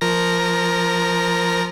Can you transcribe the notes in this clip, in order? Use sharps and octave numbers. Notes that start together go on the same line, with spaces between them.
F3 A#4 A#6